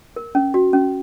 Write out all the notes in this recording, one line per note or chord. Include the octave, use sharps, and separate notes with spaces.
A#4
C#4
F#4
C#4